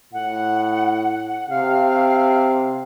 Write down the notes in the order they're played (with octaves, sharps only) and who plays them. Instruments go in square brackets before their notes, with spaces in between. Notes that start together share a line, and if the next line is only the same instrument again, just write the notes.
[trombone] A2 [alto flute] F#5
[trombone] C3 [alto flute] F5